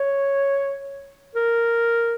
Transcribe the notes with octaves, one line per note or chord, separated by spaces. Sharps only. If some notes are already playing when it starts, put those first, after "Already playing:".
Already playing: C#5
A#4